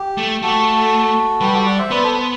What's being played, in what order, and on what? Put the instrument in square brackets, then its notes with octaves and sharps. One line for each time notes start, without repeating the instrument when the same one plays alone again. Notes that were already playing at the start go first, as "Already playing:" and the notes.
Already playing: [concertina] G4
[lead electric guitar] A3
[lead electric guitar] A3 [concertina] F#4 A4
[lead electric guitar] G3 [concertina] G4 B4
[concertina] F#4 A4
D5 F#5
C5 E5
[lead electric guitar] B3 [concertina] B4 D5
[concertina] A4 C5